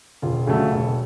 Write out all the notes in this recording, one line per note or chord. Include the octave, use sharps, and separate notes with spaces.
E1 F4
D2 C#3 F#3 A3
E1